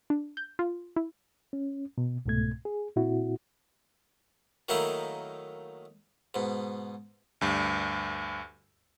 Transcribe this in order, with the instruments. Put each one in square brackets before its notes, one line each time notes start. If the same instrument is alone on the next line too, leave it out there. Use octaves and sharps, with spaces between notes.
[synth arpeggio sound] D4
G6
F4
E4
[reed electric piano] C#4
B2
C2 G#2 B2 A3 G#6
G#4
A#2 C4 E4 F#4
[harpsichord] D#3 F#3 A3 A#3 D#4 E4
G#2 B2
[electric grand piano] D2 G2